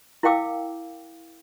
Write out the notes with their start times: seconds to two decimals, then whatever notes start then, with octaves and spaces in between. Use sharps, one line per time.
0.23 E4 A#4 F5 G5 D6 E6